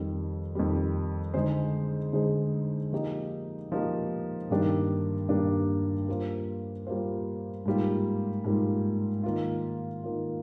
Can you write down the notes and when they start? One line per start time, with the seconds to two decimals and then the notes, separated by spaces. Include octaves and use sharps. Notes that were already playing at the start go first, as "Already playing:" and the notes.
Already playing: F2 D#3 G3
0.55 F2 D#3 G3
1.34 D3 G#3 D#4 G#4 C5
2.13 D3 G#3 D#4 G#4 C5
2.93 F3 A#3 D#4 G4
3.72 F3 A#3 D#4 G4
4.50 G2 D#3 A#3 D4 G4
5.29 G2 D#3 A#3 D4 G4
6.08 G3 A#3 F4 C5
6.87 G3 A#3 F4 C5
7.66 G#2 G3 A#3 F4
8.44 G#2 G3 A#3 F4
9.23 D#3 A#3 F4
10.04 D#3 A#3 F4